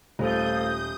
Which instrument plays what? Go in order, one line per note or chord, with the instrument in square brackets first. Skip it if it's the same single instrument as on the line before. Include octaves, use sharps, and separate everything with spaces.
[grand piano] D#1 [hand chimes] A3 C5 [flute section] A4 F5 [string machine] D#6 G6